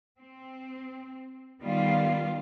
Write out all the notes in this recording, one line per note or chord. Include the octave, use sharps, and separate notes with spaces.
C4
D#3 G3 B3 F4